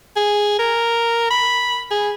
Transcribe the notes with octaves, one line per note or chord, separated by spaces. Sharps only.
G#4
A#4
B5
G#4